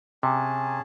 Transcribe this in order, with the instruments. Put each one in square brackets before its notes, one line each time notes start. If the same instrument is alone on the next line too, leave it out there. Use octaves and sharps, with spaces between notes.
[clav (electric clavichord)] C3 [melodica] C#4 G#4 A5